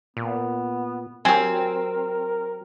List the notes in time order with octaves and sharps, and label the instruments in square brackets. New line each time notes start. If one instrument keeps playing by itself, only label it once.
[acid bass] A#2 [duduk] B3
[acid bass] F#3 [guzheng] C4 [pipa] G4 G#5 [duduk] A#4